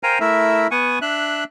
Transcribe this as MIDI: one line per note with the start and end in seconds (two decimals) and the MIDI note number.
0.03 0.18 70
0.03 0.18 72
0.03 0.18 77
0.03 0.18 79
0.03 0.18 80
0.03 0.18 82
0.20 0.67 57
0.20 0.67 64
0.20 0.67 70
0.20 0.67 76
0.71 0.99 59
0.71 0.99 78
0.71 0.99 80
0.71 0.99 85
1.02 1.44 62
1.02 1.44 76
1.02 1.44 90